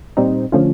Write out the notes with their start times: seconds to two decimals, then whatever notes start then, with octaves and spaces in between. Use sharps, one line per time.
0.17 A#2 G3 C4 D#4
0.52 D3 F3 A3 C#4 F4